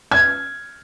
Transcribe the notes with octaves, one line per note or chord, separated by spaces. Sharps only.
G#6